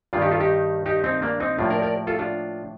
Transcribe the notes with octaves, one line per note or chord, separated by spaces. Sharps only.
G2 D#3 G3 A#3 D4 F4
D#4 G4
F4 A4
D#4 G4
D#4 G4
C4 D#4
A#3 D4
C4 D#4
A2 F3 A#3 D4 F4
A#4 D5
A#4 D5
F4 A4
D4 F4